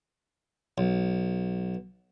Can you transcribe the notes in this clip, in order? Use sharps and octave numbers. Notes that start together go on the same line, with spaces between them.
B1